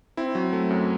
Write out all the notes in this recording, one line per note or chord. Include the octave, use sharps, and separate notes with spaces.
C4 E4
F#3
A3
F#2